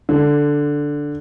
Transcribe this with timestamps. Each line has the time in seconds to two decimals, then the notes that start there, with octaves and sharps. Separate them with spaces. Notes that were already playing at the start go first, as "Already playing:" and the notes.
0.09 D3